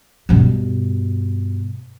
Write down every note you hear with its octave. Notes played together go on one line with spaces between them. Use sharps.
G2 B2